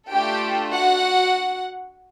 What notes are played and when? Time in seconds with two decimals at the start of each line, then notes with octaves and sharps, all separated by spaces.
0.11 A3 D4 F4 G4 A4 G5
0.72 F#4 F#5